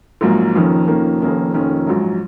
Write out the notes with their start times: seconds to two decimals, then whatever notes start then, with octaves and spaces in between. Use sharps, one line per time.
0.21 A#1 G#2 F#3 A#3
0.55 F1 F2 D#3 A#3 C#4
0.87 F1 F2 D#3 A#3 C#4
1.21 F1 F2 D#3 A#3 C#4
1.54 F1 F2 D#3 A#3 C#4
1.87 A#1 G#2 F#3